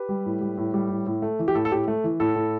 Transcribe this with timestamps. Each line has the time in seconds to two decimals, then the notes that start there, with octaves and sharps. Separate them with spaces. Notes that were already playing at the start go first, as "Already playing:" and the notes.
Already playing: G4 B4
0.09 G3
0.26 A2
0.41 G3
0.57 A2
0.74 G3
0.90 A2
1.06 A2
1.22 A3
1.39 E3
1.48 G4
1.55 A2 A4
1.65 A4
1.72 A2 G4
1.88 A3
2.04 E3
2.20 A2 A4
2.36 A2